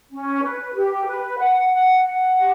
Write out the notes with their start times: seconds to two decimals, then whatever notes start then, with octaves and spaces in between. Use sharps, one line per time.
0.11 C#4
0.43 B4
0.75 G4
1.07 B4
1.39 F#5
1.71 F#5
2.03 F#5
2.35 G4